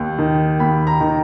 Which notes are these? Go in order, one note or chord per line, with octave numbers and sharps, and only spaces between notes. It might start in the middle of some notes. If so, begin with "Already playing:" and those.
Already playing: D#2
D#3
D#2 B5
A#5
D#3